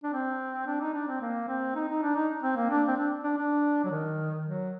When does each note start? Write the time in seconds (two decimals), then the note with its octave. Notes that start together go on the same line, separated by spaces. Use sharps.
0.04 D4
0.13 C4
0.67 D4
0.81 D#4
0.94 D4
1.08 C4
1.21 A#3
1.48 C4
1.75 D#4
1.89 D#4
2.02 D4
2.16 D#4
2.43 C4
2.56 A#3
2.70 D4
2.88 C4
2.97 D4
3.24 D4
3.37 D4
3.84 F#3
3.91 D#3
4.46 F#3